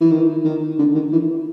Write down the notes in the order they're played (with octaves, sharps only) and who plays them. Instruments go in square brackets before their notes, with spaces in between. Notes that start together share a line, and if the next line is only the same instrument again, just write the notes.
[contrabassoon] E3
D#3
D#3
D3
D#3
E3